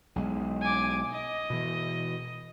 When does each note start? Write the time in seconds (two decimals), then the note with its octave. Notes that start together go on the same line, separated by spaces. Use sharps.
0.16 B1 G#3
0.62 G#5 D6
1.11 D#5
1.50 B2 E3